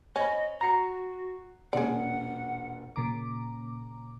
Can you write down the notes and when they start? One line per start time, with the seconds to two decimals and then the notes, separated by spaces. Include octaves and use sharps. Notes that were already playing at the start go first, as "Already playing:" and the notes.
0.16 C#4 C5 C#5 D#5 B5
0.61 F#4 F#5 A#5 C7 C#7
1.73 E1 A#2 C#4 G#4 D5 F#5
2.96 A#2 C#3 A#5 D6